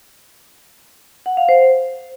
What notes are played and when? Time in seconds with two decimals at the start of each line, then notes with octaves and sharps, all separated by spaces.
1.26 F#5
1.37 F5
1.49 C5